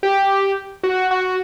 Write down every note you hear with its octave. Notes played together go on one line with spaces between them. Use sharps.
G4
F#4
F#4